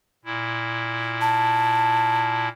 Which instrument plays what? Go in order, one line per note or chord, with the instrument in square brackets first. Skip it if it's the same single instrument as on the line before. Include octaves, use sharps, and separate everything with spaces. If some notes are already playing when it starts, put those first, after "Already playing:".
[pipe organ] A#2 E4
[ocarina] A5